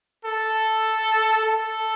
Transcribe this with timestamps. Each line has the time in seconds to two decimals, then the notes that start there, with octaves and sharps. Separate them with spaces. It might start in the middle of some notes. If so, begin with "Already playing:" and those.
0.25 A4
1.44 A4